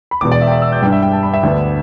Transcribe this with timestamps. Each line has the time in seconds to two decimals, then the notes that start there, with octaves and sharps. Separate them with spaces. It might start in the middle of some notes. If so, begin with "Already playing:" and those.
0.11 B5
0.21 E1 E2 B2 D6
0.32 D5
0.42 E5
0.47 G5
0.52 E5
0.62 E6
0.72 G6
0.82 G2 G3 D4 G5
0.92 E5
1.02 G5
1.13 A5
1.23 B5
1.33 E5
1.43 D2 D3 B3 D4